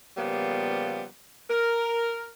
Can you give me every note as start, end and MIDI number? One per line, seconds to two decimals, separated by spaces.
0.16 1.04 49
0.16 1.04 53
0.16 1.04 55
0.16 1.04 58
0.16 1.04 59
1.49 2.27 70